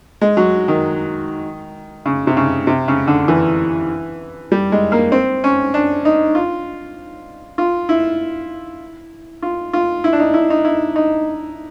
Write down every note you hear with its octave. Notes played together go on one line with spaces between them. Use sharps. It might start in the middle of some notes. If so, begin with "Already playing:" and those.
G#3
F#3
D#3
C#3
C3
C#3
C3
C#3
D3
E3
G3
G#3
A#3
C4
C#4
D4
D#4
F4
F4
E4
F4
F4
E4
D4
D#4
E4
D#4
E4
D#4